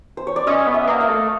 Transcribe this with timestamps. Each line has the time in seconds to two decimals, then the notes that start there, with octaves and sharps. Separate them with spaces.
0.17 C5
0.27 C#5
0.36 D5
0.47 C#4 D#5
0.67 B3
0.74 E5
0.87 A#3
1.01 F5
1.08 A3